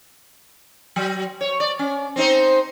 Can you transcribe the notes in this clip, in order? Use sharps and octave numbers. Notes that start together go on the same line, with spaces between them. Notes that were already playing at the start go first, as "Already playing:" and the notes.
F#3
C#5
D5
C#4
C4 D#4 C5